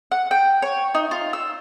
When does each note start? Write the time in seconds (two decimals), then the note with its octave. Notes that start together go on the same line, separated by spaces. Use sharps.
0.12 F#5
0.31 G5
0.62 C#5
0.95 D#4
1.11 F4
1.33 E6